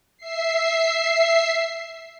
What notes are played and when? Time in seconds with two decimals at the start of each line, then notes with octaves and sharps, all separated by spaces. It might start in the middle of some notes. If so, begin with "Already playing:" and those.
0.17 E5 C7